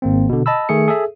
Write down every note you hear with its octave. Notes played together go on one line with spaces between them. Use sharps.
G#1 A#3 C4
B2 D3
D#5 A5 B5 E6
D#3 A3 G#4 C#7
G#4 A4 E5